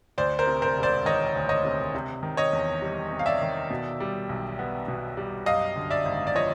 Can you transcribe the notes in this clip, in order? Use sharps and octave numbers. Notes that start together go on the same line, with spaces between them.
D2 C5 D5
A#4 C5
C3
A#4 C5
E1
C5 D5
D#3 C#5 D#5
D2
C#5 D#5
C3
C3
D#3
C#5 D#5
E2
G3
C3
F5
D5 E5
D#3
B2
G3
B1
B3
B2
G3
F#2 D#5 F5
D3
D5 E5
G#1
D5
F3 C#5 D#5